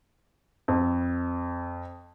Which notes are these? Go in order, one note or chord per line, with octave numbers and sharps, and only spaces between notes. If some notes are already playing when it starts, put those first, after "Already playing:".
F2